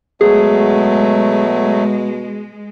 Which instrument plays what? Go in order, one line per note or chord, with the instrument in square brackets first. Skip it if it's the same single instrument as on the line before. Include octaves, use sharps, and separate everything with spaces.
[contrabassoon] B2 [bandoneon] F#3 A3 [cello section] G#3 [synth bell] G#4